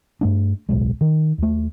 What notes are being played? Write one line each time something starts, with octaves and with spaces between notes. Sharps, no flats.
G2 A3 D4
D1 B1 G#3
D#3
D#2 A3